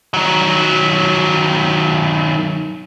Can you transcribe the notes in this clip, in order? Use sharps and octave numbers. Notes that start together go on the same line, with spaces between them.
D#3 F#3